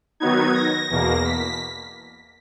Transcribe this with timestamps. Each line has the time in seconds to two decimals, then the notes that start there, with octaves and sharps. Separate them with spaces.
0.20 D#3 F#3 B3 D#4 G#6
0.54 A#6
0.90 E2 B2 A#3 A#6
1.25 B6